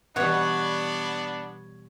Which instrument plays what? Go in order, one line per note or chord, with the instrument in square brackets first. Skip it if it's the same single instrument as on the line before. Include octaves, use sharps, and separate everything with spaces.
[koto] B2 E3 G3 [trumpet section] B3 D4 [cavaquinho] C#5 F#5